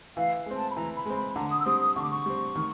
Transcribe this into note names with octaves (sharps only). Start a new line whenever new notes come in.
E3 F5
G#3 C4
A5
B5
E3 A#5
B5
G#3 C4
B5
D3 A#5
D#6
E6
G3 C4 D#6
D#6
D3 C#6
D6
C#6
G3 C4
D#3